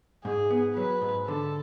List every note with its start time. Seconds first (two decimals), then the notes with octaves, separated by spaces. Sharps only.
0.25 G#2 G#4
0.51 B3
0.76 F#3 B4
1.02 G#2
1.27 D3 A4